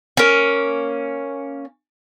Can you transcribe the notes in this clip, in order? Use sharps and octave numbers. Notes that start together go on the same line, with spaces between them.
A#3 C#4